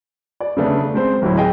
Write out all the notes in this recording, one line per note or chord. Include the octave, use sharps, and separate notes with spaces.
D5
C#3 A3 B3 D4
G#3 C4 C5
D1 F#3 E4
G#4 D#5 G5